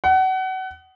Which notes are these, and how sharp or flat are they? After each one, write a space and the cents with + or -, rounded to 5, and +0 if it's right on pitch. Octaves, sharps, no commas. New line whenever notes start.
F#5 +30